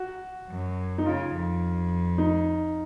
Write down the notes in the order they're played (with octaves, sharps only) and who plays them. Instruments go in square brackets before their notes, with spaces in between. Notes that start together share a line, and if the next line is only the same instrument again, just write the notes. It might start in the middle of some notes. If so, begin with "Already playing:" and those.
Already playing: [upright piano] F#4
[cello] F#2
[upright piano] D#4
[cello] C#3 [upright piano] F4
[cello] F2
[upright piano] D#4